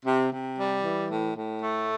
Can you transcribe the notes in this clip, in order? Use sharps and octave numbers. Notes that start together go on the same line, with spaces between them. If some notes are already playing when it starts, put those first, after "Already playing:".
C3
C3
G3
E3
A2
A2
A3